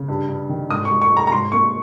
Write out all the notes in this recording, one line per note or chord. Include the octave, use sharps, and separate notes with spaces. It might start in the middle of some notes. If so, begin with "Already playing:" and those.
Already playing: C#3
G2
G2
D#3
G#2 D#6
C#6
G#2
C#6
G#3 A#5
A#5
G#2 C6
A#3 C#6